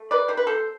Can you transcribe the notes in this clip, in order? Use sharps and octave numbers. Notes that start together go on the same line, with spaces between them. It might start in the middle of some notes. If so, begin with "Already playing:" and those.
Already playing: A3
B4 D5
C3 C5
B4
A4 C5